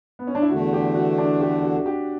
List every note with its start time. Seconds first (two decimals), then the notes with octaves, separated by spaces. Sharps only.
0.19 B3
0.27 C#4
0.35 D4
0.42 E4
0.50 E2 D3 A3 F#4
0.73 G4
0.95 F#4
1.18 D4
1.41 G4
1.63 F#4
1.86 G4